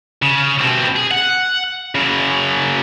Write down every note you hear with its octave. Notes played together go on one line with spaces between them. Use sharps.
C#3
B2 C4
G#4
F#5
C#3 F#3